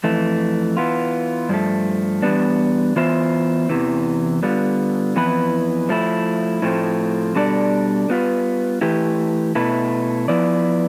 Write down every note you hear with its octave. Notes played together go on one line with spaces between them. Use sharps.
F2 E3 A3
E3 B3 F4
G2 F3 A3
E2 C3 G3 B3 D4
E3 B3 F4 C5 E5
E2 C3 E3
D3 G3 B3 F4
F2 E3 B3 E4 B4
F3 A3 E4
A2 F3 A3 C4
B2 G3 D4 A4 D5
G3 B3 F4 B4
E3 A3 E4 G4 B4
B2 A3 E4 B4
F3 B3 E4 B4 D5